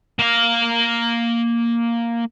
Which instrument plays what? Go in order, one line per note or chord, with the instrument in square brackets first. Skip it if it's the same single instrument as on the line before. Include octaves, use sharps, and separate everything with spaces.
[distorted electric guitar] A#3 F5